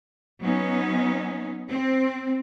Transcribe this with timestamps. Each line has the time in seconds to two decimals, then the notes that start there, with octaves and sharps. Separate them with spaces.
0.40 F#3 B3 C#4 D#4
1.71 C4